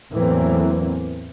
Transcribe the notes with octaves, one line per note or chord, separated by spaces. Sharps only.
E2 A2 E3 F#3 A#3 C4